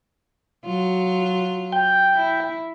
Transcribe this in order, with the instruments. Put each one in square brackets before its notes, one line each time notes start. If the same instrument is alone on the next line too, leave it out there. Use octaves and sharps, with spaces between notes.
[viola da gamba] F#3 F4
[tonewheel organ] G5
[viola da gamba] E4